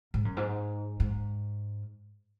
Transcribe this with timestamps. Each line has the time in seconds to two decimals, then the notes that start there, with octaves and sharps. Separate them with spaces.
0.14 G#2
0.25 F#2
0.37 G#2
1.00 G#2